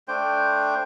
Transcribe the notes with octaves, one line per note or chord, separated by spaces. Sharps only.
A3 D4 C5 G5